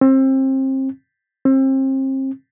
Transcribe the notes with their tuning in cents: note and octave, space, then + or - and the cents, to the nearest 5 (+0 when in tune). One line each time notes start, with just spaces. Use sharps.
C4 +30
C4 +35